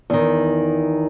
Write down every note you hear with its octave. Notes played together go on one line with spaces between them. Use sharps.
E2 D#3